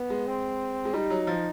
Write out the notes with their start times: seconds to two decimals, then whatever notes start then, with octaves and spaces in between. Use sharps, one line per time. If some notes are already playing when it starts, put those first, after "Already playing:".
Already playing: B3
0.10 G#3
0.27 C4
0.85 G#3
0.94 G3 D#4
1.10 F#3
1.27 F3